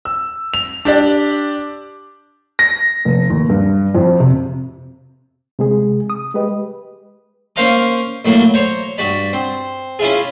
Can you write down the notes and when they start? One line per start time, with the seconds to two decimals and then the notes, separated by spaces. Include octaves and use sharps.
0.05 E6
0.54 F7
0.85 D4 G4 D5
2.59 A#6
3.05 F1
3.30 D#2
3.50 G2
3.95 F2
4.20 C3
5.59 C3 G#3 G#4
6.10 D#6
6.34 G#3 G4 B4 D#5
7.56 A#3 C#4 C5 F5 A#5 D6
8.25 A2 F#3 A#3
8.54 C5 C#5 A#5
8.98 G2 F#4 D5 B5
9.33 C4
9.99 C#4 E4 F4 G#4